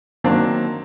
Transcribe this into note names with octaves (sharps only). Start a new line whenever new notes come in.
D#3 F#3 A#3 C4 D4